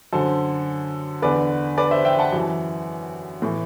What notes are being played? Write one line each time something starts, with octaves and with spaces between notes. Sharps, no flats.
F#2 D3 A4 C5
E2 D3 B4 D5
B4 D5
C5 E5
E5 G5
F#5 A5
F#2 E3
A2 E3